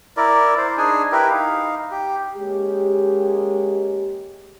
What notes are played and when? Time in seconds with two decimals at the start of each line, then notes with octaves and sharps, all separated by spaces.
0.17 E4 A#4 D5
0.58 C5
0.78 D4 D#4 G#4 G#5
1.12 E4 G4 A#4 B4
1.30 D#4 F5
1.91 G4
2.37 G#3 A#3 C#4 G4